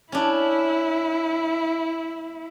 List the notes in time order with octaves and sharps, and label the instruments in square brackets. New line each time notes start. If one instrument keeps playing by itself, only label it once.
[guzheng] C#4 D4 [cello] E4